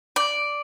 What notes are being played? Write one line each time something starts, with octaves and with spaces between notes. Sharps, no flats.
D5